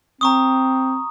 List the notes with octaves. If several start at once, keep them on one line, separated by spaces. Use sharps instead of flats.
C4 A#5 C#6 D#6